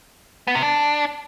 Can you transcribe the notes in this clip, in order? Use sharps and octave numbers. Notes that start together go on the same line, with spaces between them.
B3
C3
D4